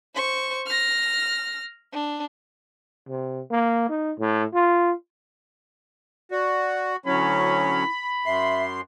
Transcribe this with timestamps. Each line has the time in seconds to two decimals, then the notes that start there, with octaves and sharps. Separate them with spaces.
0.14 C5 C#6
0.67 F6 A#6
1.93 D4
3.09 C3
3.51 A#3
3.89 D#4
4.19 A2
4.54 F4
6.31 F#4 D5
7.06 D2 F#3 C#4 E4 B5
8.26 F#2 E5 C6